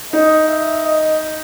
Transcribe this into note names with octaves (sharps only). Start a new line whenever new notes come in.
D#4 D#5
E5
D#5